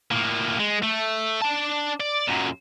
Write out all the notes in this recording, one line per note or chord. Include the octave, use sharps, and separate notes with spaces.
A2 A#3
G#3
A3
D4 A5
D5
F#2 A#2